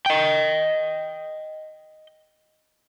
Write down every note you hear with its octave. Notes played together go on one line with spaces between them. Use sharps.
D#5 G5